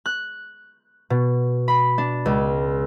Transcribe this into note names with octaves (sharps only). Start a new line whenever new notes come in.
F#6
B2
B5
D4
C#2